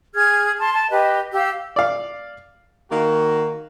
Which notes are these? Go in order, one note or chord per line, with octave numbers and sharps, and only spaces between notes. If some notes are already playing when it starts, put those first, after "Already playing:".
G#4 F6 G#6
A5 C6
A5
G4 B4 D#5
G4 F5 E6
D5 F5
D#3 A#3 F#4